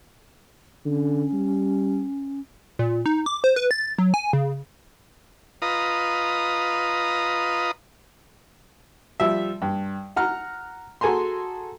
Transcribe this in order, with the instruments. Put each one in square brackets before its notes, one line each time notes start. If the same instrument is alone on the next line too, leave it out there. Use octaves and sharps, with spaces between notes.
[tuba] D3 [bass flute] C#4
[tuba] G3
[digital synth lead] A#2
D#4
D6
C5
B4
A6
F#3
G#5
C#3
[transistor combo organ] F4 B4 D#5 A#5 D#6
[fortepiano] F3 G3 E5
G2
F#5 A#5 F6
F#4 G#4 A4 G#5 A#5 C6